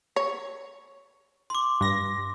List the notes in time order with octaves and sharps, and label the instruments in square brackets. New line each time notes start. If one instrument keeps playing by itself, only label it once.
[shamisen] C#5
[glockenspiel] C6 D6
[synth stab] G2 A#6